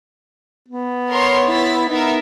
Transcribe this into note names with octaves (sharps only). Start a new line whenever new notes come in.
B3
A#4 C#5 C6
E4 A6 B6
B3 D#4 A#4 E5